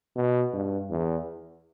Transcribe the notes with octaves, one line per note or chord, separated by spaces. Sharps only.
B2
G2
E2